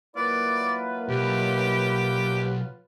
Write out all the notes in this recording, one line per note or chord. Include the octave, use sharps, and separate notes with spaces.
F#3 A#3 E4 F4 B4 D5
B1 G4